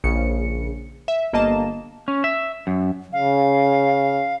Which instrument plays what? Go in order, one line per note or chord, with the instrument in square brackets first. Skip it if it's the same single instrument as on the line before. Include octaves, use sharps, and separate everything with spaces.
[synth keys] A#1 C#3 C#7
E5
G1 A#3 D#5 A5 E7
[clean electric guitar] C#4
E5
F#2
[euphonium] C#3 [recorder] F5